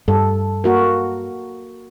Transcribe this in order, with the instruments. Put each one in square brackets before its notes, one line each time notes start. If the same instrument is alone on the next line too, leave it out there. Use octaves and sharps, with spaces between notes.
[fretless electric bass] G2 [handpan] A4
[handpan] A#3 F#4 A#4